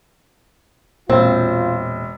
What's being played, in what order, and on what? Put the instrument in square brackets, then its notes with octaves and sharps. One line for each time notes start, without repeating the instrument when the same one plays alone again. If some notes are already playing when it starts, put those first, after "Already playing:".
[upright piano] E1 C5 [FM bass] A#2 [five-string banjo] C4 [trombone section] F4